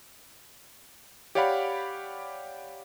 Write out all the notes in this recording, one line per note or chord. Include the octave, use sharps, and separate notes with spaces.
G4 C#5 D5 F5 F#5 B5